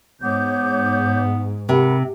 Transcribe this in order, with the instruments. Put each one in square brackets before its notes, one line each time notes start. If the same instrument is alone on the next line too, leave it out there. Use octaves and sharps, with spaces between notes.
[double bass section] G#2 [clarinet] B3 [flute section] C#5 D6 G6
[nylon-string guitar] C3 [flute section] A#4 F#5 B5